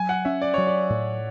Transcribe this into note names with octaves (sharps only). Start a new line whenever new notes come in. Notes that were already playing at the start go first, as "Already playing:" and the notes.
Already playing: F#3 G#5
F#5
C#4 E5
D5
F#3 C#5
D5
A2